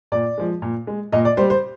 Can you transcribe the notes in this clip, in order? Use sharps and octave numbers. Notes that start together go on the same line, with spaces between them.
A#2 D5
F3 G#3
A#2
G#3
A#2 D#5
D5
G3 C5
C5